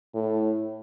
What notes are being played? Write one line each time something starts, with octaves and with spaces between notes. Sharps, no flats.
A2